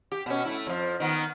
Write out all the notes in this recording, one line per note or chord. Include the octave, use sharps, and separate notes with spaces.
G4
B2 C#4
A3 E4
F2 F3
D#3 B3